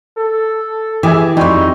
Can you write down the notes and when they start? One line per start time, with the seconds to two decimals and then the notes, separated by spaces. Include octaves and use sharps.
0.18 A4
1.03 E3 G4 G#4 E5
1.37 F2 G3 D#4 F#4 C6